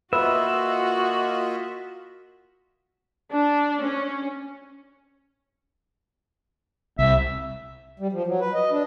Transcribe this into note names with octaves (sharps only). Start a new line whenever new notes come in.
A#3 F4 F#4 B4 D#5 E5
D4
C#4
C2 E5
G3
F3
F#3
B4
D#5
D4